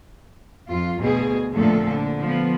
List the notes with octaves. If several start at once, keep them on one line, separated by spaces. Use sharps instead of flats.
F2 F4
D2 B2 G#4
F2 A#2 D3 F3 A3 A4
D3
F3 B3